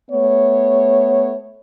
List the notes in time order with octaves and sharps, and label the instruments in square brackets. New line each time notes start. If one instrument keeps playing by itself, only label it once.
[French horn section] A3 B3 C#5